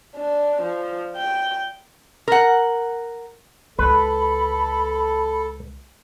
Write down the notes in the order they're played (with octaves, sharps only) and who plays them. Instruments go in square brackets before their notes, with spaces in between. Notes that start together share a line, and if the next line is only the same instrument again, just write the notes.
[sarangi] D4
F3
G5
[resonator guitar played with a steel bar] A#4 F#5
[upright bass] C#2 [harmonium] A4 [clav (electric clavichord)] B4 [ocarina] B5